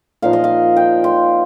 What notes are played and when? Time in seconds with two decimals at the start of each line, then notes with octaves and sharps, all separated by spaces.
0.22 A#2 F3 D#4 F5
0.33 D#5
0.44 F5
0.77 G5
1.04 C6